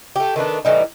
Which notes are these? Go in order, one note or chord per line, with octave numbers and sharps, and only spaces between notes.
A3 G4
D#3 A3 B3 D4
A2 E3 G3 D#4